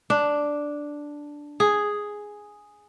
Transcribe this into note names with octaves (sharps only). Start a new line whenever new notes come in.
D4
G#4